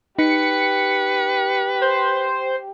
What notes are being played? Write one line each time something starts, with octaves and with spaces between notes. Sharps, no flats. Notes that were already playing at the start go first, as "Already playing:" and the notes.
D#4 G4 B4 C#7
C5